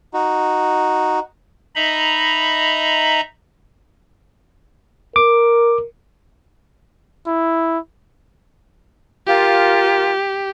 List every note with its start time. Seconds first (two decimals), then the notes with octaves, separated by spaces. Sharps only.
0.14 D#4 F#4
1.76 D#4 D#5 E5 A#5 B5
5.16 A#4 D6
7.27 E4
9.27 F4 G4 A#4